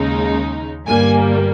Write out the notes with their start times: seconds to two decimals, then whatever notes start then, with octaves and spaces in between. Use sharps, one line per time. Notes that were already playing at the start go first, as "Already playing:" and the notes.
Already playing: D#2 C#3 G#3 D#4
0.86 G1 G2 G3 A#3 G#5